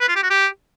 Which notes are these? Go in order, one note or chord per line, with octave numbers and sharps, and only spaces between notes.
B4
F4
G4
F#4
G4